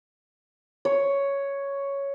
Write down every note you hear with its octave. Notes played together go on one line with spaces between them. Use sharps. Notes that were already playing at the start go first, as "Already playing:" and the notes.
C#5